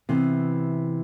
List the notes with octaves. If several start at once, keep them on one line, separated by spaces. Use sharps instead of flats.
C3 E3 B3